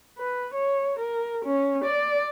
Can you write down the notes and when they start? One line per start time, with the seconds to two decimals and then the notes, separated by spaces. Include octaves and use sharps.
0.17 B4
0.54 C#5
0.99 A#4
1.45 C#4
1.84 D5